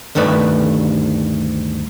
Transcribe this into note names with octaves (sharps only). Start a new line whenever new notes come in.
D2 G2 D#3 A3 B4 D5